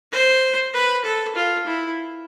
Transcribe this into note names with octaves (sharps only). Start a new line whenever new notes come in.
C5
B4
A4
F4
E4